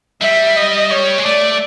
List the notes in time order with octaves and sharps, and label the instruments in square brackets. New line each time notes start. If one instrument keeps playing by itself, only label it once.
[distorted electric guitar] G3 [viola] E5
[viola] D#5
C#5
[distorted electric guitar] G#3
[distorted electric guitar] A3 [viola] D5